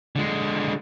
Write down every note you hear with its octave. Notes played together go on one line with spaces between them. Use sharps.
D3 G#3